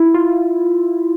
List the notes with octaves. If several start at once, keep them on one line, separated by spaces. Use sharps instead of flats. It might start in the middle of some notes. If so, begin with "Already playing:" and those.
Already playing: E4
F4